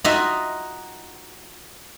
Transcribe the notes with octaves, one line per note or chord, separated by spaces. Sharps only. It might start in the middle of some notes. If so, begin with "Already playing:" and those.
D#4 F4 F#4 D#5 E5